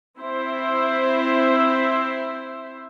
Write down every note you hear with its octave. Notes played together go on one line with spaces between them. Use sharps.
C4 E4 C5 E5